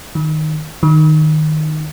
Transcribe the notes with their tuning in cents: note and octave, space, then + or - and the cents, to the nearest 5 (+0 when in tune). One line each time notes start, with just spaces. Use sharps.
D#3 -5
D#3 -10